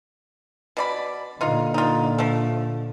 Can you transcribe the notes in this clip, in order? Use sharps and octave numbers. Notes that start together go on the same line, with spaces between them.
B2 D5 B5
A#2 D3 D#4 F4
D#4 F4
F3 A3